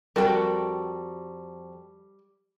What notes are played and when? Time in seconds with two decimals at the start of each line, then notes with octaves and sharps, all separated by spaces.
0.16 F2 G3 F#4 A4 A#4 G5